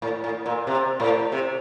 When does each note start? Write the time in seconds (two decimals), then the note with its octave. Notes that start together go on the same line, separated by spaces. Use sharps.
0.02 A2
0.24 A2
0.46 A#2
0.67 C3
1.00 A2
1.32 C3